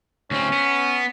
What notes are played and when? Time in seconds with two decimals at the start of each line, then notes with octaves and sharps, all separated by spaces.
0.31 D2 C4 C#4
0.53 B3